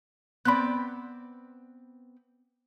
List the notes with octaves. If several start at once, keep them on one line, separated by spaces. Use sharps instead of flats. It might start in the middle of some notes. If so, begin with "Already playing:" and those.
B3 C4 D5 B5 F#6